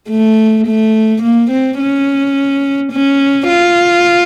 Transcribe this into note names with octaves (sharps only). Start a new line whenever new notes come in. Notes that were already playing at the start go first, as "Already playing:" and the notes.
A3
A3
A#3
C4
C#4
C#4
F4